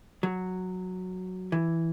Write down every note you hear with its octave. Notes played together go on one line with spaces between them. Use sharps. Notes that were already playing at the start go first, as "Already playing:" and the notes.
F#3
E3